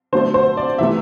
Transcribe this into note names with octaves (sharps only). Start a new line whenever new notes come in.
D3 F#3 A3 D4 C5
C5
D5
C3 E3 A3 E5